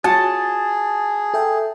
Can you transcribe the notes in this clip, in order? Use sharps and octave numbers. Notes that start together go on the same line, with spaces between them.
F4 F#4 G#4 F#5 A5
A4 E5 G5